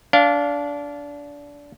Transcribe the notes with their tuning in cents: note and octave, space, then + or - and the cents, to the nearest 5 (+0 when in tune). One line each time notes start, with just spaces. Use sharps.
D4 -25 F5 +0